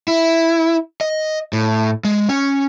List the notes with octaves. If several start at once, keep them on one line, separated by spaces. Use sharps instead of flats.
E4
D#5
A2
G#3
C#4